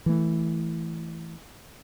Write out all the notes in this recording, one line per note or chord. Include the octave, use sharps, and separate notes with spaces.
E3 A3